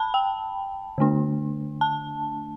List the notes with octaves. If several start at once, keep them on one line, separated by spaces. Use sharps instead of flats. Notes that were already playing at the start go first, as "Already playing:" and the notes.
Already playing: A5 B5
G5
D3 A3 D4
A5